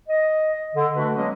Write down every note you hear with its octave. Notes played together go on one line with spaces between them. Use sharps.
D#5
D3
A3 D4 F#4 B4
F#3 G#3 A#3 C#4 D#5